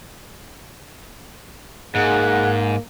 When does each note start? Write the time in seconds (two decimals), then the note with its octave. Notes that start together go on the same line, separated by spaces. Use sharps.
1.95 G#2 A#3 G#4 D#5 F#5